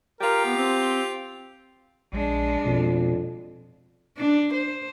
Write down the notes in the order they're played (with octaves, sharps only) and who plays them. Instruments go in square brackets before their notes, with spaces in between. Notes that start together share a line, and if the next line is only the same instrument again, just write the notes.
[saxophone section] F4 G4 [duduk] A#4
[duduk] B3
C4
[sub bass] A#1 [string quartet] G#3 D4
[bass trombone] F2 [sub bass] B2
[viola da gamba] D4
C5